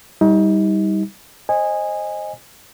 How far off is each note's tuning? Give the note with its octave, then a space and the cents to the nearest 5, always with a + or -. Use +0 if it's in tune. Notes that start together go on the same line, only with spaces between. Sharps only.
G3 +0 D#4 +35
C5 +25 D#5 +0 G#5 -15